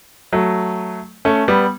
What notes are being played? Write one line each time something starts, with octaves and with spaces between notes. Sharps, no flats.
F#3 A3
A3 C#4
G3 B3